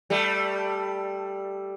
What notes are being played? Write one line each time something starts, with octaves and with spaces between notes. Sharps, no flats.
G3 A3